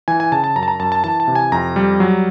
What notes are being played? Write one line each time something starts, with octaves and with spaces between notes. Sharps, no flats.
E3 G#5
G#5
C#3 A5
A5
F#2 A#5
A5
A#5
F#2 A5
A5
E3 A5
A5
C3
G#5
F2 A#5
G3
F#3